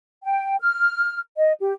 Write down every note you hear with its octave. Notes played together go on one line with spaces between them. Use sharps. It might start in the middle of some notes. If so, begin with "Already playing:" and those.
G5
F6
D#5
G4